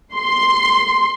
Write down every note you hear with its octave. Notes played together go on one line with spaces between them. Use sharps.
C6